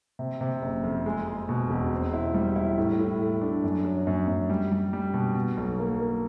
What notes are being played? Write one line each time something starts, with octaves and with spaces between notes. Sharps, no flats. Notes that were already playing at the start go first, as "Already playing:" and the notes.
C3
C3
F#1
F2
G#3
G#3
B2
E1
C4
E4
G3
E4
A2
A2
A3
D4
F#2
F#3
F#2
F#2
G3
G3
G3
B2
B2
B1
A#3
A#3